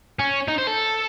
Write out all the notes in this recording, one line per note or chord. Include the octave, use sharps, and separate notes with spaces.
C#4
D#4
C5
A4